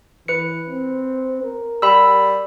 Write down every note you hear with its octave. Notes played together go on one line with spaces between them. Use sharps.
E3 B4 C#7
C4
A#4
G3 B5 E6